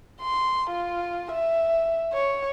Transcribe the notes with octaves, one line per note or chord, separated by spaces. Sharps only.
C6
F4
E5
C#5